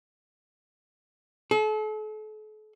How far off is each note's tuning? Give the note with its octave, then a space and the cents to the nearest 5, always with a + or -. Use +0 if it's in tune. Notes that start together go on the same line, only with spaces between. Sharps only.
A4 -40